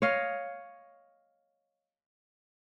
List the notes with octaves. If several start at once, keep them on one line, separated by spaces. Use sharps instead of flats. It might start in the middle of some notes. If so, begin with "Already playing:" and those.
C#5 D#5 F5